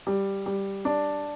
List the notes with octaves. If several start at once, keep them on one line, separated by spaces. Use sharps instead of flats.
G3
G3
D4